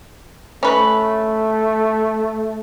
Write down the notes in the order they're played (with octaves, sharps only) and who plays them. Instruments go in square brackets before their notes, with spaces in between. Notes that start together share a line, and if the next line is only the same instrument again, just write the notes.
[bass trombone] A3 [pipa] C#4 B4